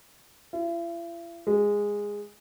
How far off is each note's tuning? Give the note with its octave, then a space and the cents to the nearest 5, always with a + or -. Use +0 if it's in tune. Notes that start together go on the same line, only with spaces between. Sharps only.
E4 +45
G#3 -10